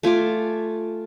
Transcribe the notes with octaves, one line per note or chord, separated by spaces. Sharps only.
A3 F4 G#5 D6